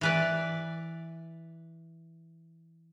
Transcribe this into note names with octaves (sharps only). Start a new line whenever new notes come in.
E3 B4 D5